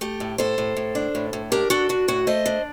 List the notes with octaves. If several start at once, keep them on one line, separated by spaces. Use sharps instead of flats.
A3 G4
A2
A2 A4 C5
A2
A2
D4
A2
A2
D4 G4 A#4
D4 F#4 A4
D4 F#4
A2 F#4
A3 C5 D#5
D4